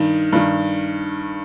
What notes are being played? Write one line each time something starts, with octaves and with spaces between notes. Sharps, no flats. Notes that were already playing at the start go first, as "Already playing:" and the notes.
Already playing: G2 D#3
G2 D#3